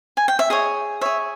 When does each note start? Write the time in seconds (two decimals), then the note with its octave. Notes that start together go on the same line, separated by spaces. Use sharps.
0.17 G#5
0.28 G5
0.39 E5
0.50 G#4 C#5 D#5
1.01 G#4 C#5 E5